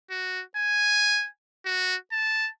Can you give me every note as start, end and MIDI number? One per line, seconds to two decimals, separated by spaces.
0.10 0.42 66
0.56 1.27 80
1.66 1.95 66
2.12 2.49 81